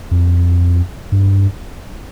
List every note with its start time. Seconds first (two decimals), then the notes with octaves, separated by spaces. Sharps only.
0.11 F2
1.12 G2